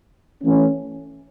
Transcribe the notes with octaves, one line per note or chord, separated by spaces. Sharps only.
E3 A3 C#4